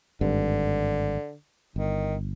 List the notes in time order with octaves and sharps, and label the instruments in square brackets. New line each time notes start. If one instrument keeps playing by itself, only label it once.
[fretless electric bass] G#1 G2 [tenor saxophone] D3
[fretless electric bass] G1 [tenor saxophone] D#3